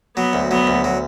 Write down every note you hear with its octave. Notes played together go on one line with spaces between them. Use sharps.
F#3 B3
D2
F#3 B3
D2
F#3